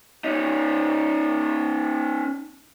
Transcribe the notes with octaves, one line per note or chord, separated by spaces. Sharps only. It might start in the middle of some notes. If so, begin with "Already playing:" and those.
C#4 D#4